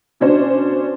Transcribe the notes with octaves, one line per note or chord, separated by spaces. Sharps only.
B2 C#4 D4 C5